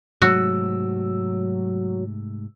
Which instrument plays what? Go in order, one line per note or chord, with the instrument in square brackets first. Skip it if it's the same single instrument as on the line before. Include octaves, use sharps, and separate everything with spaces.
[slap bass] G#2 C3 A3 [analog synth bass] F#3 [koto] F#4 [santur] E6